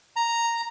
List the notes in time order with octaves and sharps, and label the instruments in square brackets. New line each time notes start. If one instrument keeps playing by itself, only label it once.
[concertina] A#5